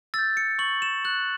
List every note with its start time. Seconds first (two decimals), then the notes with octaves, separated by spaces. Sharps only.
0.14 E6 G6 A6
0.37 C#7
0.59 C#6 F#7
0.82 E7
1.05 F#6 F#7